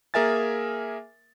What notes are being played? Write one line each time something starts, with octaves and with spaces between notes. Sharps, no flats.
A#3 G#4 A#4 E5 G#5 A6